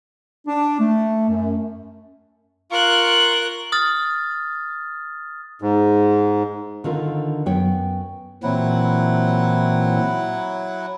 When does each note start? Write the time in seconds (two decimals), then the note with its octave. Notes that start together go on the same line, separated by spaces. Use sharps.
0.47 D4
0.79 A3
1.29 F#2
2.71 F4 A#4 F5 C#6 F#6
3.72 D#6 F6 A6
5.62 G#2
6.84 D3 D#3 C4 F4 A#4
7.46 F#2 B3 C#5 G5
8.43 A#2 E3 F#3 C4 E4 F#5